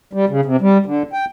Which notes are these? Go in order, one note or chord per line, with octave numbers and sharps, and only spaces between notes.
G3
C#3
C3
G3
D3
G5